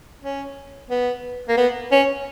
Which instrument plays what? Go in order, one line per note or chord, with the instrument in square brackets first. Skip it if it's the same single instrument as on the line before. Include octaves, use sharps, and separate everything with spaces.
[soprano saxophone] C#4
B3
A#3
B3
C#4